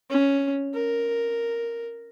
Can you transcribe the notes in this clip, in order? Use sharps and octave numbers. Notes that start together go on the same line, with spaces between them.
C#4
A#4